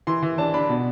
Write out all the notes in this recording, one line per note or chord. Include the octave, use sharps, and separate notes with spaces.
E3 C6
E3
D4 A5
D4 B5
B2